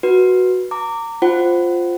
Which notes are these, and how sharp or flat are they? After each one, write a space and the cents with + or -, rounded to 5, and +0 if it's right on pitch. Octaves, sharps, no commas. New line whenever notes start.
F#4 +0 B4 -15
A#5 -30 D6 -10
F4 +5 C5 +0 F#5 +25